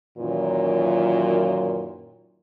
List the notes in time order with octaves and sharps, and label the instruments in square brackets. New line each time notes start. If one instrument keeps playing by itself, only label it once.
[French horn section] F#2 A#2 D#3 E3 F#3 F4